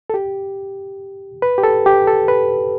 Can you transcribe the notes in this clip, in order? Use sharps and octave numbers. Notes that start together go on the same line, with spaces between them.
A4
G4
B4
G4
A4
G4
A4
B4